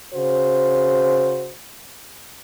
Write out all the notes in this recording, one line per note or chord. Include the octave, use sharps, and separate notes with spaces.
C#3 F#4 C5